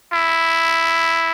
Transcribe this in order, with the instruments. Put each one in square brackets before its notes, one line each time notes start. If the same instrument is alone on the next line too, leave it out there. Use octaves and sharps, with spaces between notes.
[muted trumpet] E4